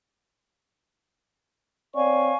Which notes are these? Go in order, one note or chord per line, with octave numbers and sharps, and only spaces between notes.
C4 C#5 D5 F5 G#5 C#6